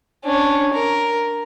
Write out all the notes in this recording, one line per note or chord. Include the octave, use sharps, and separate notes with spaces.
C#4 D4
A#4